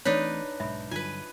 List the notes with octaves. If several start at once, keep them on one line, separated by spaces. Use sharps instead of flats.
E3 A3 C4 D4 D#4 B4 C#5
B1 G#2 E5 B5
G2 D3 F#3 F4 B4 G#5